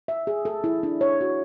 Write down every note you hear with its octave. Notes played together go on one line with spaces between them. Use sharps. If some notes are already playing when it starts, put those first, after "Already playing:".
E5
G#4
A4
E4
D4
C#5
F#4